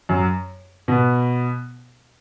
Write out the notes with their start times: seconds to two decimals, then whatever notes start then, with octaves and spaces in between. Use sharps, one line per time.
0.09 F#2 F#3
0.88 B2 B3